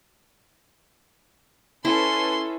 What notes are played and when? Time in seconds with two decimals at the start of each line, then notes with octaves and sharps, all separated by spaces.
1.85 C#4 E4 A4 B4 C6